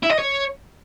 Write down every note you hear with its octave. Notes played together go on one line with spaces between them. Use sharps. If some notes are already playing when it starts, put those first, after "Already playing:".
E4
D#5
C#5